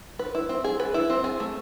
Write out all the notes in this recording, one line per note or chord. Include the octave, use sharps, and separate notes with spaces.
B4
E4
C4
G#4
B4
E4
C4
G#4
A3